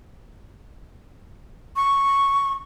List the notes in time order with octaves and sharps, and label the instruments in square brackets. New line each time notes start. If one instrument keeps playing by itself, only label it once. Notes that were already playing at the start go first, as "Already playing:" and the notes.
[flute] C#6